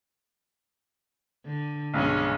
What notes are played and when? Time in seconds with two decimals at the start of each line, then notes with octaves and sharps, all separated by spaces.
1.46 D3
1.94 B1 G2 C#3 G#3 C#4